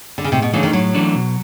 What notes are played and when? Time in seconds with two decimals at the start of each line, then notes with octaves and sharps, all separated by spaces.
0.18 D3
0.24 C#3
0.32 A2 C3
0.42 B2
0.53 C#3 E3 A3 D4
0.63 D#3
0.73 A2 F#3
0.95 E3 A3 D4
1.15 B2